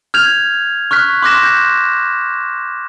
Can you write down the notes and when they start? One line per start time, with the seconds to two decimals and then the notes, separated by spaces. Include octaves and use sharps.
0.14 F6 G6 G#6 F7
0.91 C#6 F6 F#6 B6
1.22 C6 D6 F#6 A#6 E7
1.43 G6